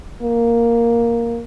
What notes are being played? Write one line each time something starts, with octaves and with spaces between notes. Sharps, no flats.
A#3